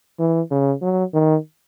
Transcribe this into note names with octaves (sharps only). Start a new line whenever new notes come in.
E3
C#3
F#3
D#3